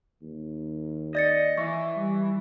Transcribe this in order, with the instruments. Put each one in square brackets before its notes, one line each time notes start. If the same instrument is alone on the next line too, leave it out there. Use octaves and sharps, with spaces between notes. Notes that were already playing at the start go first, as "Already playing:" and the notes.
[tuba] D#2
[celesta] D5 A6 C#7 [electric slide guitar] D#5
[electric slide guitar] E3 [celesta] C#6
[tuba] G3